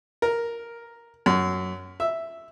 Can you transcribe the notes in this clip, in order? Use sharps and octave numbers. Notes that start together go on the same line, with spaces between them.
A#4
F#2
E5